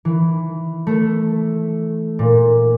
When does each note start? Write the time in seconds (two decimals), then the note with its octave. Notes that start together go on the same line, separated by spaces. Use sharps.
0.05 E3
0.87 A3
2.19 A#2